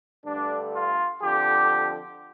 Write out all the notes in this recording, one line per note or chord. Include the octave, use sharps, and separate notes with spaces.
G2 D3 A3 D4
F4
F2 D3 F3 G4